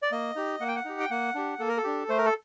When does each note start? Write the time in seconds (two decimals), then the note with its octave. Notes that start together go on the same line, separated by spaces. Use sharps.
0.02 D5
0.12 A#3 D#5
0.36 D#4 G4
0.60 A#3 F#5
0.68 G5
0.76 F#5
0.85 D#4 G4
1.00 G5
1.10 A#3 F#5
1.35 D4 G4
1.59 A#3 A4
1.69 A#4
1.77 A4
1.84 D4 G4
2.09 A3 C5
2.18 A#4
2.25 A4